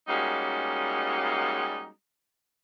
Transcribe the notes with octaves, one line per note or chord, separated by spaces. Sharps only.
G3 G#3 A#3 C#4 D#4 F#4